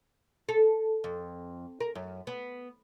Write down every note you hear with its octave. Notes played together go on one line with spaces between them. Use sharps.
A4
F2
A#4
F#2
B3